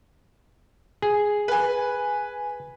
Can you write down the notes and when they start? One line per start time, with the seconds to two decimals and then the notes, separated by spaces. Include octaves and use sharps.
1.02 G#4
1.48 B4 G#5